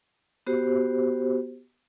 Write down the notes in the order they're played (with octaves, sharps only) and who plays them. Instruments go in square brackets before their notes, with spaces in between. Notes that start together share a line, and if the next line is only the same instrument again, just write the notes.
[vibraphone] B3 F#4 G4 C5